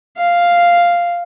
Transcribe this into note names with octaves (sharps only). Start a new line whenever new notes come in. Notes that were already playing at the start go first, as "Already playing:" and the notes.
F5